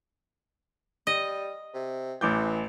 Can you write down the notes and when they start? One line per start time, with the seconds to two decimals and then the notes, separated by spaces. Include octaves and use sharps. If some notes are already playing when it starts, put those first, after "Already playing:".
1.07 G3 D#5
1.74 C3
2.21 A1 E3 D6 G6